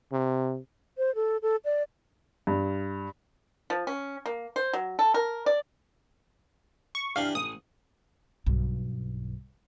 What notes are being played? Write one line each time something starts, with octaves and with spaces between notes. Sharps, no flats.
C3
C5
A4
A4
D5
G2
F3
C#4
A#3
C5
F#3
A4
A#4
D5
C#6
E3 D4 G4 F5
A1 D#6
B1 G2